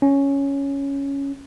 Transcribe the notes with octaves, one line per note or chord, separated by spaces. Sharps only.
C#4